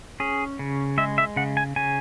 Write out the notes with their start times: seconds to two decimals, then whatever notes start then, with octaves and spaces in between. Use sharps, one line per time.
0.20 C#4 G#4
0.59 C#3
0.98 G#3 E5
1.18 E5
1.36 C#3 F#5
1.57 G#5
1.76 C#3 G#5